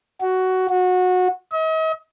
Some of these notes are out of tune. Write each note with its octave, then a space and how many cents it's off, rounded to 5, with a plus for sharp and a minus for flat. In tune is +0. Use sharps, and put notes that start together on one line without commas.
F#4 +10
F#4 -20
D#5 +45